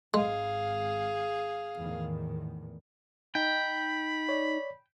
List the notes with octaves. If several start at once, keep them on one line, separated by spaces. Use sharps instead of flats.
G#1 G#3 G#4 F5
E2 A2 D#3
D#4 G5 B5
C#5 D5